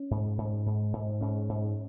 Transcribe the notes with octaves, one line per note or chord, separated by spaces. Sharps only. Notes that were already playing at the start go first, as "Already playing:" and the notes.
Already playing: C#4
G#2
G#2
G#2
G#2
G#2 C#4
G#2